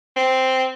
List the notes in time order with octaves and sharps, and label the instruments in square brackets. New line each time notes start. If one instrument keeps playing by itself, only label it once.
[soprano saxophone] C4